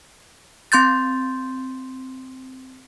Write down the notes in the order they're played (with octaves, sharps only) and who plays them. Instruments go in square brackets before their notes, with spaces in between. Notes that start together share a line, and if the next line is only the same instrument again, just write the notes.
[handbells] C4 C6 G6 A6